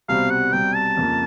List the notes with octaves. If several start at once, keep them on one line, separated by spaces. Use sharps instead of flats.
C2 B2 G3 C4 F5
F#5
C2 B2 G3 C4 G5
A5
F2 C#3 F3 A#3